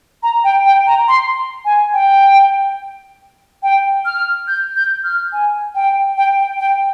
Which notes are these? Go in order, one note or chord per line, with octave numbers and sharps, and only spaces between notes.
A#5
G5
G5
A#5
C6
G#5
G5
G5
F6
G6
G6
F6
G#5
G5
G5
G5
G5